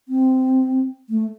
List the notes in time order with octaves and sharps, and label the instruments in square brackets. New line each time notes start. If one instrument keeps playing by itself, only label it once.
[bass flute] C4
A3